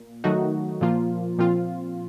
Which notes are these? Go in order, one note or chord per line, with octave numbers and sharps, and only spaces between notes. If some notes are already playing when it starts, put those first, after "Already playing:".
Already playing: A#2
D#3 F#3 A3 D#4 F#4
A#2 F3 A#3 F4
A#2 F3 C4 F4